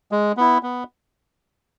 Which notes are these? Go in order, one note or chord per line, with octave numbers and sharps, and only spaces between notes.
G#3
B3 E4
B3